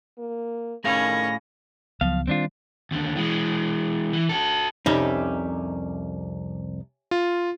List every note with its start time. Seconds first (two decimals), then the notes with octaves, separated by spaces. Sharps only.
0.18 A#3
0.84 A2 D#3 C#4 G#4 F5 A#6
2.01 C#2 F3 F#3 B3 F5
2.27 D#3 G3 C4 D4 F4
2.91 D#2 D3
3.16 E3 G#3
4.13 E3
4.29 F#4 A4
4.86 C2 F2 C#4 D#4 G4 E5
7.11 F4